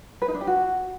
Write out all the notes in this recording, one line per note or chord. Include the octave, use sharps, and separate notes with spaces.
B4
D#4
D4
G4
F#4